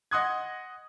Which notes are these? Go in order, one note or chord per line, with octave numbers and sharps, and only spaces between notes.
D#5 F#5 C6 D#6 F#6 G#6